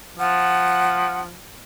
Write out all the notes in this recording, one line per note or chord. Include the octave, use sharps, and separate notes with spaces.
F3 F#5